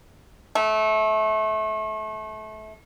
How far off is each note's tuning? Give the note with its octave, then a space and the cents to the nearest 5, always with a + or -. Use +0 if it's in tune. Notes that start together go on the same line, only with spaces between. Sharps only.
A3 -25